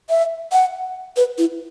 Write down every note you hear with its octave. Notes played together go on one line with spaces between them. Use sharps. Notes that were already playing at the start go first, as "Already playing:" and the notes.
E5
F#5
B4
E4